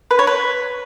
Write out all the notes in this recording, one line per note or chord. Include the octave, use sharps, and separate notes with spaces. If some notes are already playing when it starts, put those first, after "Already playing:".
B4
C#5
B4